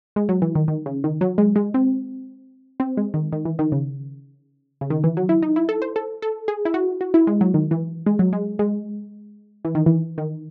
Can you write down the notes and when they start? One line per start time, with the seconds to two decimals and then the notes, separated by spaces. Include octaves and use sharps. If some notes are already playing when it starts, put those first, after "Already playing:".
0.16 G#3
0.29 F#3
0.42 E3
0.55 D#3
0.68 D#3
0.86 C#3
1.04 D#3
1.21 F#3
1.38 G#3
1.56 G#3
1.74 C4
2.80 C4
2.97 G#3
3.14 D#3
3.33 D#3
3.45 E3
3.59 D#3
3.72 C#3
4.81 C#3
4.90 D#3
5.04 E3
5.17 F#3
5.29 E4
5.42 D#4
5.56 E4
5.69 A4
5.82 C5
5.96 A4
6.22 A4
6.48 G#4
6.65 E4
6.74 F#4
7.01 F#4
7.14 E4
7.27 G#3
7.41 F#3
7.54 D#3
7.71 E3
8.06 G#3
8.19 F#3
8.33 G#3
8.59 G#3
9.65 E3
9.75 D#3
9.86 E3
10.18 D#3